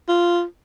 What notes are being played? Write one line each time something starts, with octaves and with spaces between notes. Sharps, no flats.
F4